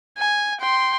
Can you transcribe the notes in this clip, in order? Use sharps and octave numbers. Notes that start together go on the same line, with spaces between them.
G#5
G5 C6